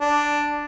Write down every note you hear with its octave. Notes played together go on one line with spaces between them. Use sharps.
D4